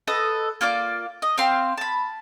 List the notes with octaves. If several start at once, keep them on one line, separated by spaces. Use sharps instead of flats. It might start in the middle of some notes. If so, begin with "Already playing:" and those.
A4 B4 D#5
A#3 F4 D5 D6
D#5
C4 F5 C6
A5 B5